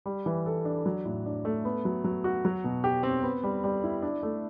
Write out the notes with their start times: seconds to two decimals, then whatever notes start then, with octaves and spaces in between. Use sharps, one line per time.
0.06 G3
0.26 E3
0.46 A4
0.65 D4
0.86 F#3
1.05 A2
1.26 D4
1.45 A3
1.65 B3
1.85 F#3
2.04 F#3
2.24 F#4
2.45 F#3
2.64 B2
2.84 G4
3.03 C4
3.23 B3
3.43 G3
3.64 G3
3.83 E4
4.02 D4
4.23 A3